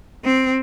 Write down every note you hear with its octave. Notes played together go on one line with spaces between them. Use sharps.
C4